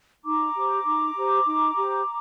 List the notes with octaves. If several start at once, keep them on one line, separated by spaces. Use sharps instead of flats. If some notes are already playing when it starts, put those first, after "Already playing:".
D#4 A#5 D6
G4 C5
D#4
G4 C5
D#4
G4 C5